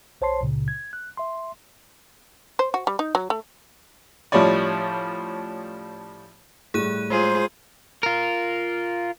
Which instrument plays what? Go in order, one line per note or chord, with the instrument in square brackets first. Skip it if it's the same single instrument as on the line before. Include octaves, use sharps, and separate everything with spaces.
[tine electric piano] B1 C5 C#5 A5 C6 C7
C#2 A#2 C#3
G#6
F#6
E5 C6
[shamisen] C5
F#4
G3
D#4
F#3
A3
[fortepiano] A2 F3 G3 C#4 C#5 D5
[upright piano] A2 G3 [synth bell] G#4 F#6 D#7
[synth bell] G#3 [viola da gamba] F4 G#4 [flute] C5
[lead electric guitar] F4 A#4